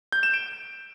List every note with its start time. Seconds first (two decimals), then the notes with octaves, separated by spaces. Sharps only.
0.12 G6
0.23 E7
0.34 D7